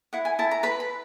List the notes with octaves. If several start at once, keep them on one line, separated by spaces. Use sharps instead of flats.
E4 F#5
G#5
E4 A5
A#5
B4 B5
B5